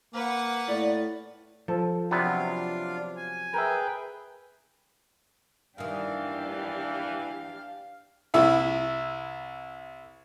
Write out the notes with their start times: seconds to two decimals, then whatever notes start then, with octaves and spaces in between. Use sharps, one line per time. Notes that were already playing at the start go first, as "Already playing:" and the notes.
0.14 A#3 B4 F#5
0.68 A2 D5
1.68 F3 A4
2.11 C3 F#3 B3 D4 F4 F5
3.16 G#5
3.54 G#4 A#4 B4 E5 G5
5.78 G2 D#3 E3 D4 G4 F5
8.34 C2 E4 E5